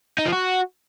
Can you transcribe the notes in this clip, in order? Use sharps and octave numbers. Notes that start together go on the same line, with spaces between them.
D#4
F3
F#4